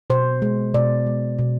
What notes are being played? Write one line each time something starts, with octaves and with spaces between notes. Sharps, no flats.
B2 C5
G#3
B2 D5
G#3
B2